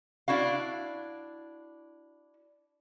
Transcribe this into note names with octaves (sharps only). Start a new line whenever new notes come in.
D4 E4 F#4 F5